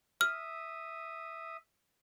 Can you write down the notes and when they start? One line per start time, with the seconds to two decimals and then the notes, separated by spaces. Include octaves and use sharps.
0.21 E5 D#6 F6